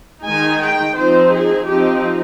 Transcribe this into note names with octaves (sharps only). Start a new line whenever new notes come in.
D#3 G#3 D#4 G#5
G5
F3 C4 D#4 C5
G#4
F3 C4 D#4 G4